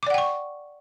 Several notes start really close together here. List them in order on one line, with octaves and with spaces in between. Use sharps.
D6 D5 F#5 G5 C#6